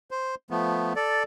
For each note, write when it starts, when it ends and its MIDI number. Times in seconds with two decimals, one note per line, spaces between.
0.11 0.35 72
0.50 0.93 53
0.50 0.93 57
0.50 0.93 59
0.96 1.23 69
0.96 1.23 74